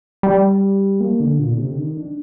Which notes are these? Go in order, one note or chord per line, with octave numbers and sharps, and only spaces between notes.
G3
A#3
D3
A#2
D3
C3
D3
D#3
D4